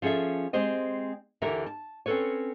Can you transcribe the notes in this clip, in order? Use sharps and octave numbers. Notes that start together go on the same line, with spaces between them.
F3 C#4 G#4 A4 E5
G#3 C4 G4 C5 D#5
D#2 D3 E3 G4 A#4 E5
A5
C4 C#4 D#4 A4 B4 C#5